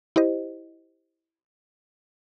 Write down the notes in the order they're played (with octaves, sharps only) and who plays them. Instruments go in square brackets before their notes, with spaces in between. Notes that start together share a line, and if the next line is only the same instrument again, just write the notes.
[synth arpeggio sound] E4 G4 C5 D#5